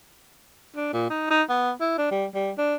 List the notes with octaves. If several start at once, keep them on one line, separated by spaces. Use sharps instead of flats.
D4
A#2
D#4
D#4
B3
E4
D4
G3
G3
D4